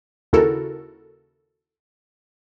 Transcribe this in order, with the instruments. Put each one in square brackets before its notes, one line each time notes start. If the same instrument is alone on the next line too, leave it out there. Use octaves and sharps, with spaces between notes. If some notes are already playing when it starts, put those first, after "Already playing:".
[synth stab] D#2 C#3 E4 F#4 A4 A#4